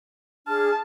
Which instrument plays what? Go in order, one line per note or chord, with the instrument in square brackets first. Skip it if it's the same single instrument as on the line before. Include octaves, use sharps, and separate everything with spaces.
[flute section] D4 G#4 F6 [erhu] A5